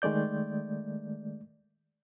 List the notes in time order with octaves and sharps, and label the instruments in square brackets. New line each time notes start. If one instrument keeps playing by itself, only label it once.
[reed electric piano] D#3 G#3 A3 D5 G6